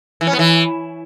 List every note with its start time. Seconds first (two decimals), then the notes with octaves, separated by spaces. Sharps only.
0.21 E3
0.27 C#4
0.33 B3
0.39 E3